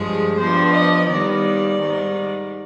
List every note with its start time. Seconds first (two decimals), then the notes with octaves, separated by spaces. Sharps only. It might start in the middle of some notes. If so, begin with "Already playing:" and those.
Already playing: G2 F3 G#3 G#4
0.39 G2 F3 B3 C5
0.73 D#5
1.08 D#2 D#3 G3 B3 D5
1.78 G#2 D#3 G3